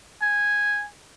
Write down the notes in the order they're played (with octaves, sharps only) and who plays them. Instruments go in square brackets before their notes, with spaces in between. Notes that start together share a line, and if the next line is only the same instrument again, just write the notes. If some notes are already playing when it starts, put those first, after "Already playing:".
[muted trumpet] G#5